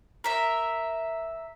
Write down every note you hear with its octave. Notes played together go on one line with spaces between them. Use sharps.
A#4 E5